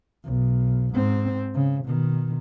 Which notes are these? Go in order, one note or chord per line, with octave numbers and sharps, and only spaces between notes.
B1
G#2 C4
C#3
B2 D#3